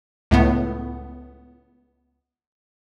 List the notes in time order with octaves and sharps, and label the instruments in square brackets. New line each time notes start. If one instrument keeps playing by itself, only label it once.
[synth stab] C#2 A2 A3 B3